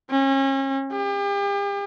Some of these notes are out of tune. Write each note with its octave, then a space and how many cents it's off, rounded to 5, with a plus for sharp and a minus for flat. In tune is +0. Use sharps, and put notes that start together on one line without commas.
C#4 -35
G4 +40